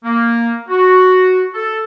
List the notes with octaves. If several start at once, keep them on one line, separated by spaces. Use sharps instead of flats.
A#3
F#4
A4